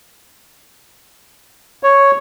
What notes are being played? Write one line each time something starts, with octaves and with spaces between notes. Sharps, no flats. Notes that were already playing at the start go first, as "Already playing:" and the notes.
C#5